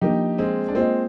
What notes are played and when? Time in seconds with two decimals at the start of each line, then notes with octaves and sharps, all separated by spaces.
0.01 F3 A#3 D4 D#4 G4
0.38 G#3 C4
0.68 D4
0.75 G#3 A#3 C4 F4 C5 D#5